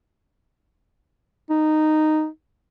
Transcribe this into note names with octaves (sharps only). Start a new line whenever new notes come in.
D#4